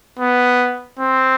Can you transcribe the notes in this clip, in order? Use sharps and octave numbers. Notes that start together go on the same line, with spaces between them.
B3
C4